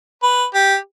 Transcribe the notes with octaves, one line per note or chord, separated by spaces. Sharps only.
B4
G4